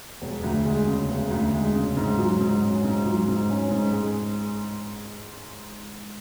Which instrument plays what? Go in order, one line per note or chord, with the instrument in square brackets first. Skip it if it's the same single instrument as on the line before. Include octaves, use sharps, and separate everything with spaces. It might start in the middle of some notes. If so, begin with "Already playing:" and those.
[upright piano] E1
D2
G#3
C#3
E1
D2
G#3
C#3
G#2
F#3
G#2
C#4
G#2
F#3
G#2
C#4
G#2
G#3